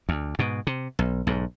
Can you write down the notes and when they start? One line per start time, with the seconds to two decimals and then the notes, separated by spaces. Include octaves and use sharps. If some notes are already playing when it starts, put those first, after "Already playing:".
0.09 D2
0.39 G#2 B2
0.67 C3
0.99 B1
1.27 B1 G#2